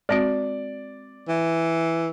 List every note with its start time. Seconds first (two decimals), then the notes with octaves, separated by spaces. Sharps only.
0.09 G#3 C4 F#4 D5
1.28 E3